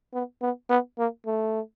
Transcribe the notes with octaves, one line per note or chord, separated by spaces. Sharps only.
B3
B3
B3
A#3
A3